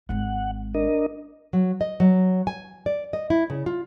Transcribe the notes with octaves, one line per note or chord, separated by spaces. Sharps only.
G#1 G#3 F#5
D4 A#4 D#5
F#3
D#5
F#3
G#5
D5
D#5
E4
C#3
F4